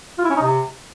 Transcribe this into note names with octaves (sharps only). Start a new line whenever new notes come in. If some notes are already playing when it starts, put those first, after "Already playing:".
F4
E4
C#4
D#4
C3